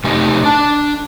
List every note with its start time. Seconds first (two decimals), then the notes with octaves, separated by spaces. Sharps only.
0.04 C3 A3 D#4 G4
0.43 D4 A5